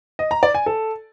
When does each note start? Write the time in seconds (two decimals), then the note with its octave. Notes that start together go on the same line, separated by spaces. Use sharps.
0.19 D#5
0.31 A#5
0.43 D5
0.55 G#5
0.66 A4